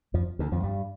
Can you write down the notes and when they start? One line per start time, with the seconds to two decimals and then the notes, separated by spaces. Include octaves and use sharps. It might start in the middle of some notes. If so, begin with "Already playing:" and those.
0.14 F2 F3
0.39 D2 D3
0.52 F2 F3
0.63 G2 G3